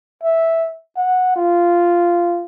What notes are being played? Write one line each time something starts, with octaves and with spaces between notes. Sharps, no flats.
E5
F#5
F4